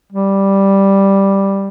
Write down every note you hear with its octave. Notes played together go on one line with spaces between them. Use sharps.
G3